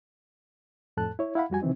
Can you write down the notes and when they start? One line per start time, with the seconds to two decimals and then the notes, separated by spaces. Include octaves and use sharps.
0.97 F2 A2 A4 A5 F#6
1.19 E4 C#5
1.35 E4 F5 F#5 B5
1.50 F2 G3 F#4 G#5
1.62 C3 D#3 E3 C4 D#4